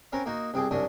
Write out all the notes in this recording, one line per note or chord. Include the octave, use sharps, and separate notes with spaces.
C4 C#4 A#4 B4
A#3 D#4 F#4
C2 C4 G#4 D6
C2 F#2 D4 F#4 D#6